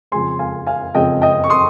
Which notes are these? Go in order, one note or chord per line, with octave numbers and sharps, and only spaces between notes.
F2 C#3 F3 G#3 C4 G#5 C6
F5 G#5
F5 G#5
F2 C#3 F3 G#3 C4 D#5 G5
D#5 G5
C#6
C6 D#6